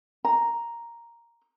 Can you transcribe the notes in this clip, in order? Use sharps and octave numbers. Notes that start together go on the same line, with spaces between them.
A#5